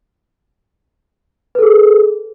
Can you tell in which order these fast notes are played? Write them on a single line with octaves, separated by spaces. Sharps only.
B4 A4 G#4